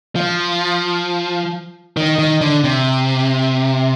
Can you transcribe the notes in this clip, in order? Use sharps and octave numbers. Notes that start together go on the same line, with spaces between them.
F3
D#3
D#3
D3
C3